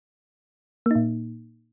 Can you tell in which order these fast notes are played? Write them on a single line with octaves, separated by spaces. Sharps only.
A#3 D#4 A#2